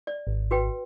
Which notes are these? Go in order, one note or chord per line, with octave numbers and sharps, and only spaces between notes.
D5
G#1
F#4 B4 G5